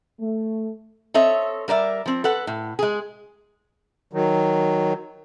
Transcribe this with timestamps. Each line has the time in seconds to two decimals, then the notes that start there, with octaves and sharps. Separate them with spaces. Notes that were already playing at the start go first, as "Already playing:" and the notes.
0.20 A3
1.14 C4 A4 C#5 D#5 E5
1.68 G3 A#4 D5 E5
2.06 F3 C4
2.24 A4 B4 F#5
2.47 A2
2.79 G#3 G#4
4.13 D#3 F#3